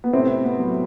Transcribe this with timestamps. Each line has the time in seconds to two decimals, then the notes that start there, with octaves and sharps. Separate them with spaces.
0.04 B3
0.13 A2 C3 C4
0.44 B3
0.59 F#3